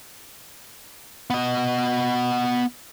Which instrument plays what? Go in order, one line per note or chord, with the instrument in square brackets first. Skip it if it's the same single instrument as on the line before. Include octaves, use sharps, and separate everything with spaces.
[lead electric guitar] B3 D#5